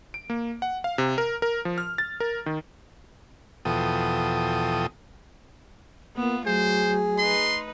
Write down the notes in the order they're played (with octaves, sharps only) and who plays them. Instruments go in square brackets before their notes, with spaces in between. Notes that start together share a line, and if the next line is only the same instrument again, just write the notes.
[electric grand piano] D7
A#3
F#5
F5
C3
A#4
A#4
F3
F6
A6
A#4
D#3
[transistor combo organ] E2 B2 F3 A4 G5 D#6
[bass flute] A#3 [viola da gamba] B3 F4
[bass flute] F#3 [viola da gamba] A3 [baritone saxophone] G#4 [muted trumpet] C5
[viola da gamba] D#4 B4 [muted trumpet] C6